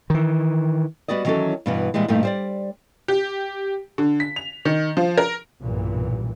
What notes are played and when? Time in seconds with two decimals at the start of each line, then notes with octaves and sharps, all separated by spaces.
0.10 D#3 E3
1.08 G3 B3 F#4 D5 D#5
1.25 D#3 E3 F#3 C#4 F#4 A4
1.66 G2 B2 E3
1.94 A#2 E3 G3 G#3
2.08 G2 A#2 F3 A3 D#4
2.23 G3 C5 D5
3.08 G4
3.98 D3
4.20 B6
4.36 F7
4.65 D#3
4.97 F3
5.18 A#4
5.60 B1 G2 A#2 E3